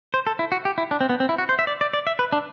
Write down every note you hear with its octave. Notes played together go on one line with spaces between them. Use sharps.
C5
A4
E4
F#4
G4
E4
D4
C4
B3
C4
E4
F#4
C5
E5
D5
D5
D5
E5
B4
D4